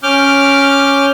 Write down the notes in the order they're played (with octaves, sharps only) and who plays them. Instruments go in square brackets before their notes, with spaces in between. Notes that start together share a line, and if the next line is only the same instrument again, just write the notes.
[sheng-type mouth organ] C#4 D6 F6 G6